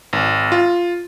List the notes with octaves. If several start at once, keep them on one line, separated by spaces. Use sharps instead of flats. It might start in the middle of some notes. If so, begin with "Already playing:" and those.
G#1
F4